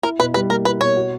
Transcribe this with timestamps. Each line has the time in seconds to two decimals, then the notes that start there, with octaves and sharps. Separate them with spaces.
0.03 E4 A#4
0.20 B2 B4
0.34 G3 B4
0.50 A#3 A#4
0.65 E4 B4
0.81 B2 C#5
0.97 F#4